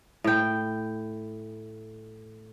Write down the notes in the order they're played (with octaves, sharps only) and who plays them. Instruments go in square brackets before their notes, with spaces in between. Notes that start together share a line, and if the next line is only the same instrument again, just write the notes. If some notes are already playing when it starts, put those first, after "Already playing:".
[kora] A2 G5